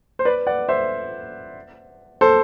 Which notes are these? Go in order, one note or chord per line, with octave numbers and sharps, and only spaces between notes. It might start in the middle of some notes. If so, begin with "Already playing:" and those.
C5
B4 D5
D5 F#5
C5 E5
A4 C5